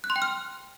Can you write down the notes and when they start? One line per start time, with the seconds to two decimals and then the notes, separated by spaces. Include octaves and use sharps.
0.04 F#6
0.10 C6
0.16 G5
0.22 F6